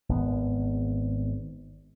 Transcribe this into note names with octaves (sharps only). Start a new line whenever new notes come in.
G#1 B3